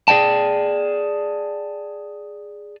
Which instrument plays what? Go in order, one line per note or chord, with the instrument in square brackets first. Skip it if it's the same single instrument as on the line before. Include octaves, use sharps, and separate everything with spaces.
[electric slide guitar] G#4 D5 G5 A5